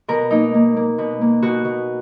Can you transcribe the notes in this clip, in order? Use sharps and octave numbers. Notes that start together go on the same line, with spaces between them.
B2 A#4
A#3 D#4
A#3
A#3
B2
A#3
B2 F#4
B2